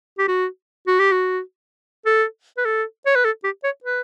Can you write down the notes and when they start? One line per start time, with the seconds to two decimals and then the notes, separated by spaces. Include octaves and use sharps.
0.19 G4
0.28 F#4
0.87 F#4
1.00 G4
1.12 F#4
2.06 A4
2.58 B4
2.65 A4
3.06 C#5
3.16 B4
3.25 A4
3.44 G4
3.64 C#5
3.84 B4